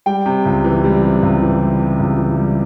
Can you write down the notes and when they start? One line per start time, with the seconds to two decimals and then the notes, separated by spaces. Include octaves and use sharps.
0.06 G3 G5
0.26 C3
0.46 C#2
0.64 E3
0.84 G3
1.03 C3
1.22 C#2
1.42 E3
1.60 G3
1.79 C3
1.99 C#2
2.18 E3
2.37 G3